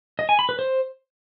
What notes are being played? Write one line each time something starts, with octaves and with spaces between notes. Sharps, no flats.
D#5
G#5
B5
B4
C5